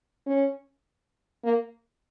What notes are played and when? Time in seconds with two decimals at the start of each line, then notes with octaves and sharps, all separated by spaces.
0.26 C#4
1.44 A#3